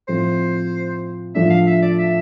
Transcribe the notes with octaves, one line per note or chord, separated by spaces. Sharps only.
A2 F3 C4 C5
A2 F3 A3 D4 E5
F5
E5
D5
E5